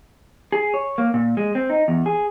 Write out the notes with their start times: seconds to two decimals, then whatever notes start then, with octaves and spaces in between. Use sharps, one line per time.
0.52 G#4
0.74 C#5
0.98 A#3
1.14 A#2
1.37 G#3
1.55 C4
1.70 D#4
1.88 E2
2.06 G#4